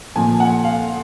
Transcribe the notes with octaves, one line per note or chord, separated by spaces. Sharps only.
A#2 F3 G#5
F#5
F5